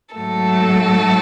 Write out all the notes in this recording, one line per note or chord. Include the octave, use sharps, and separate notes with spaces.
G#2 F#3 A3 A4